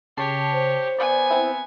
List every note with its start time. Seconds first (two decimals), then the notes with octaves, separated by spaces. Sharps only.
0.17 C#3 G4 C#5 A5 C7
0.53 C5
0.99 B3 D5 G#5
1.30 C4 E4